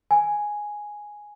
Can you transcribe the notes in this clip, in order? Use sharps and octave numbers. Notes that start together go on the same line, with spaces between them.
G#5